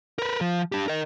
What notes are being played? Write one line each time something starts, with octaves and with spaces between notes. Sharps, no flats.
A#4 B4
F3
D4 G4
A#4 D#5